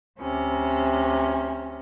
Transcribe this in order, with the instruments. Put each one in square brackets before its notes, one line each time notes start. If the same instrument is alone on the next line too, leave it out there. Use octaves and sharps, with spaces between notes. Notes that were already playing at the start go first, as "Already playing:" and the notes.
[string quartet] D2 C3 C#4